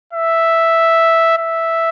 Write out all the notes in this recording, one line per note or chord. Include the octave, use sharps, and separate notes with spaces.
E5
E5